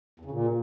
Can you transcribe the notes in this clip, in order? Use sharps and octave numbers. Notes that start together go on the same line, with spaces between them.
E2
C#3
A#2